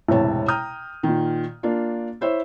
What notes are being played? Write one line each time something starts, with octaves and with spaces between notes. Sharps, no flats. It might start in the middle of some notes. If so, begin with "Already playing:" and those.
E1 A1 C3 E3 C#5 A5
G5 A#5 D#6 F6 G6
A#2 D#3
A#3 D4 F4
E4 C5 C#5 E5